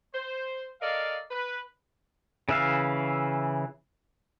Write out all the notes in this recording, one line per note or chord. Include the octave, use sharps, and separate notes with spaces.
C5
A4 A#4 D5 D#5 F5
B4
C#3 E3 E5 F5